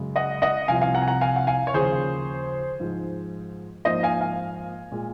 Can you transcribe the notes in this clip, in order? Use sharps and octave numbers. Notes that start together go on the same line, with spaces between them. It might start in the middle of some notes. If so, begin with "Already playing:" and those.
Already playing: F#2 C#3 G#3
D#5 F#5
D#5 F#5
C2 C3 F3 F5 G#5
F5 G#5
F#5 A#5
G#5
F#5 A#5
F5 G#5
F#5
F5 G#5
C#5
D#2 C#3 F3 G#4 C5
G#2 F3 G#3
G#2 F3 A#3 C5 D#5
F5 G#5
F5 G#5
A#2 G#3